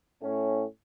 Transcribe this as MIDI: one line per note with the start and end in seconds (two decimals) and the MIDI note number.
0.22 0.64 45
0.22 0.64 61